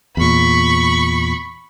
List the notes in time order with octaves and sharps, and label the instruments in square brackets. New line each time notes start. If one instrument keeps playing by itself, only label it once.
[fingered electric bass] E2 A#2 [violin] B5 C#6